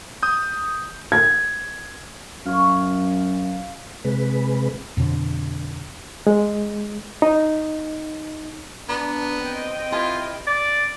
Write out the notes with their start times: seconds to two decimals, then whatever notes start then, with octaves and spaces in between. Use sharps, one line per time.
0.23 D#6 G6
1.12 G#6
2.46 F#2 C#5 F5
4.05 C3 G#3 B4
4.97 F2 B2 D3
6.27 G#3
7.22 D#4
8.89 B3 D4 D5 A#5
9.39 C4 D#5 G5
9.92 E4 F4 G4 A#4
10.47 D5